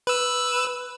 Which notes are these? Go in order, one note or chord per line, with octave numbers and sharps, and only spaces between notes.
B4 E6